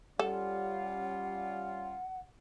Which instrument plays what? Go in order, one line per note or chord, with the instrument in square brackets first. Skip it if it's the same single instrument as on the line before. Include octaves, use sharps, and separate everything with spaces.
[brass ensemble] G3 C#4 F4 [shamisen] A4 [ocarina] F#5